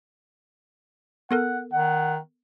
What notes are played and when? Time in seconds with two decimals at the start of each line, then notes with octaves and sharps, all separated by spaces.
1.31 B3 A4 A#4 F#5
1.73 D#3 F#5